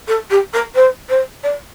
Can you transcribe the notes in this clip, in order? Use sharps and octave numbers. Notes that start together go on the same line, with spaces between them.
A4
G4
A#4
C5
C5
D5